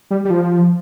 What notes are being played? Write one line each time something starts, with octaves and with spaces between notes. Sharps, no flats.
G3
G3
F3